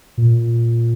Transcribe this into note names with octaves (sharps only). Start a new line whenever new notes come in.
A#2